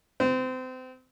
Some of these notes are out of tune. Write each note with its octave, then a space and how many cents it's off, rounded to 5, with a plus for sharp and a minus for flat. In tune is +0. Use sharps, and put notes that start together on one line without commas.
C4 -30